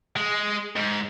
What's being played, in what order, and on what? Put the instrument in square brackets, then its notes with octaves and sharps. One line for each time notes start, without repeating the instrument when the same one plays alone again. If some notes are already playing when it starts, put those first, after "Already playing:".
[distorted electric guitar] G#3
G#2